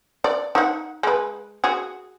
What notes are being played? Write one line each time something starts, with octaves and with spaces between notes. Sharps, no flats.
D5
D#4 F#5
G#3 B4
F#4 G#4